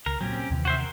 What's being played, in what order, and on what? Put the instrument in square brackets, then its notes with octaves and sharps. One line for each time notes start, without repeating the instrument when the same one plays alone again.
[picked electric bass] C#2 [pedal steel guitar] A#4
[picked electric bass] A#2 F#3 [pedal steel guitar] C4 C#4 G4
[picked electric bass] D#2 C3 E3
[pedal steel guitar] F#4 C5 E5
A#4